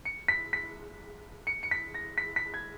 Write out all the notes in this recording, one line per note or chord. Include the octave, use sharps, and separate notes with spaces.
C#7
B6
B6
C#7
C#7
B6
A#6
B6
B6
G#6